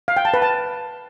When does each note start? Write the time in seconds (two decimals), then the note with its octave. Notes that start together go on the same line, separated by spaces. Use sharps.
0.08 F5
0.17 G5
0.25 A5
0.34 B4
0.42 A5